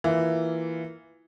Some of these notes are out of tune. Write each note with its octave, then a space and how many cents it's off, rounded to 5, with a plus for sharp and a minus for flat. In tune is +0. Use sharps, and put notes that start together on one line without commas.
E3 +0 A#3 +0 F4 +0